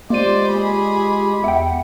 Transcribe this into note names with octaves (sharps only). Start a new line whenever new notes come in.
G#3 A#3 F4 G4 C5 D5 D#7
G#4 B5
E2 E5 F#5 G5